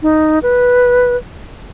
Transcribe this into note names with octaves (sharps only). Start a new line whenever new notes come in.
D#4
B4